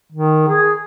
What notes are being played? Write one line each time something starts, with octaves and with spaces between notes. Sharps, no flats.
D#3
G#4